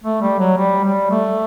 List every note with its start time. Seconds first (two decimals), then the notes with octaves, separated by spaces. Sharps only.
0.04 A3
0.22 G3
0.39 F#3
0.57 G3
0.84 G3
1.11 A3